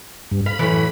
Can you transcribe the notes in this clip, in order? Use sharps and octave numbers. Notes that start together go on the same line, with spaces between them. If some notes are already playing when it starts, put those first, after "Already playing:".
G2
F5 B5
F#2 A2 E3